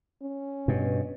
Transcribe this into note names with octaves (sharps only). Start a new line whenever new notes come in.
C#4
G2 B2